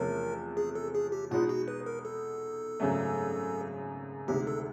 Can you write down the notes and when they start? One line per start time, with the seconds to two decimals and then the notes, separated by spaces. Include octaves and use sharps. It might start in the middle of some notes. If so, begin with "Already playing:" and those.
Already playing: E2 C3 F3 A3 C#4 A#4
0.57 G#4
0.75 A4
0.95 G#4
1.12 G4
1.31 B2 G#3 B3 D#4 F4
1.49 F#4
1.68 B4
1.86 A#4
2.05 A4
2.80 G#1 F#2 C#3 F#3 A3
4.28 D2 C3 D#3 G#3 G4
4.47 A4